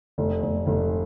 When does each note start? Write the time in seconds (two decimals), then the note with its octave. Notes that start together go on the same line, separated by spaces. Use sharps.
0.18 F1
0.43 F1
0.67 F1